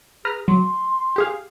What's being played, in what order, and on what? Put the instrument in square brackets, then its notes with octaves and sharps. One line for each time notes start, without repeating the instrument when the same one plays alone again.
[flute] G#4 [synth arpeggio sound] B4 A#5 F6
[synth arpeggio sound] F#3 [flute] C6
[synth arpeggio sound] G4 G#4 F5